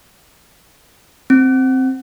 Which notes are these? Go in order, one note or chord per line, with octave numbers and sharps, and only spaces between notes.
C4